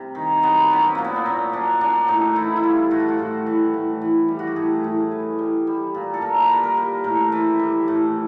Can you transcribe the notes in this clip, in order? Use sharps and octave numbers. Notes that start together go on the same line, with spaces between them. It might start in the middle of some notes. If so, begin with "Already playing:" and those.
Already playing: C3 G3
D#3
F#3 B3
F#3 C#4
C4
A#2 A#3
B3
C4
A#2 C#4
F#3 D4
F#3 D4
A2 D#4
E3 E4
E4
G3 F4
A2 F#4
F4
F#4
A2
E3
A2
E3
G3
F#4
G4
A2 G#4
A2
E3
G3
G3
A#2
A4
A#2 A#4
B4
G3
A#4
G3
A2 A#4
E3
G3
A2